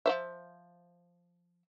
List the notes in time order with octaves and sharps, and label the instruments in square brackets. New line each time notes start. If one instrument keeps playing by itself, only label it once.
[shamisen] F3 C5 E5